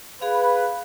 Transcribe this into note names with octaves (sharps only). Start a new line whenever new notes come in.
G#4 B4 F5